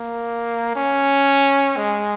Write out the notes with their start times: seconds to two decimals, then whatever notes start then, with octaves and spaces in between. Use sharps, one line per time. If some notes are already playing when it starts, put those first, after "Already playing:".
Already playing: A#3
0.75 C#4
1.76 G#3